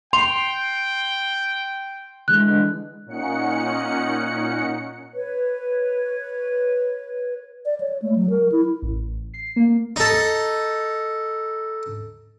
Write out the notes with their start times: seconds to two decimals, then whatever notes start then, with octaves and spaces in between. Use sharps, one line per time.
0.13 G5 C6 F7
2.28 D3 E3 G#3 F#6
3.06 A#2 C#4 D#4 F#5 C#7
5.13 B4 C#5
7.65 D5
7.81 C#5
8.02 A3
8.16 F#3
8.30 A#4
8.52 E4
8.82 A1
9.34 C7
9.56 A#3
9.96 D#4 A4